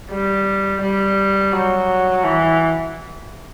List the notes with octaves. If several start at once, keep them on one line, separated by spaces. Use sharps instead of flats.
G3
G3
F#3
E3